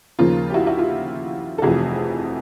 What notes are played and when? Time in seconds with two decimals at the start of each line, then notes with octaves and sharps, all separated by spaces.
0.19 D#2 C#3 F3 A#3 F4
0.50 G4
0.54 E4 F#4
0.67 E4 F#4
0.78 F4 G4
1.58 A4
1.62 F1 F2 C3 E3 F#4 G#4